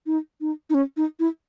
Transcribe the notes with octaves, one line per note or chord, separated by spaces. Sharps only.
D#4
D#4
D#4
C#4
D#4
E4